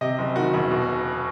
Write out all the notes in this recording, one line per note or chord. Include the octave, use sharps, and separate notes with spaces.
C3 D#5
F#1
D#3 F#4
E1
B2